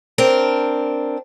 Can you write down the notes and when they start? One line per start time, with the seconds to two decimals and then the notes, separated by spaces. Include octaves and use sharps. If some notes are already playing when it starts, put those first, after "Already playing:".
0.18 C4 D4 A#4